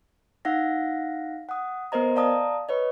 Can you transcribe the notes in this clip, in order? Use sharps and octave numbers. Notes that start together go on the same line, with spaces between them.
D#4 F5 F#5 A#6
F#5 D#6
B3 A#4 C5 D#5 A#5
D5 F5 A5 A#5 D#6
B4 C#5 D#5